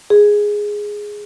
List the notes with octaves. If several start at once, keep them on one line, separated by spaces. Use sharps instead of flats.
G#4